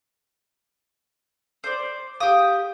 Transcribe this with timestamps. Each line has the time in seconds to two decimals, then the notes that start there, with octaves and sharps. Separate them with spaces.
1.64 C5 D5
2.20 G4 F5 D#6